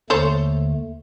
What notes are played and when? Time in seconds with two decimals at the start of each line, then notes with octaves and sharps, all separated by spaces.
0.10 D#2 D3 A3 A4 C5 C#5